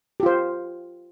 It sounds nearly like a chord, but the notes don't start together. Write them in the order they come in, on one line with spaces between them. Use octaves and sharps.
G4 F4 C5